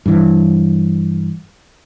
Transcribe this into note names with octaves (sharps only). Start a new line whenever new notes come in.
G2 E3